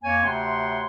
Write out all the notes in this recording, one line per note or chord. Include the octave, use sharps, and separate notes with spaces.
F2 A#3 C#5 G#5
D2 C3 C#5 F#5 G5 C6